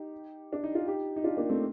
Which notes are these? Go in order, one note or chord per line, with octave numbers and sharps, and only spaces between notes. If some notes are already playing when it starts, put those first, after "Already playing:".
Already playing: D#4 G4
D4
D#4
F4
D#4 G4
D#4
D4 F4
A#3 D4
A3 C4